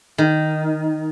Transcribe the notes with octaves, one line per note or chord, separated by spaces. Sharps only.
D#3